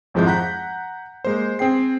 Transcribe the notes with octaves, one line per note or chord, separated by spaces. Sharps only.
G#1 F2 F3 G#3 E4 G6
F#5 A#5 F#6 G6 B6
G#3 A#3 C5
C4 G#4 G5 C7